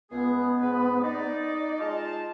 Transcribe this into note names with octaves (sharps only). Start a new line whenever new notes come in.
C#2 B3 G#4
G#2 B4
D#4 D5 D#5
G#3 F4 A5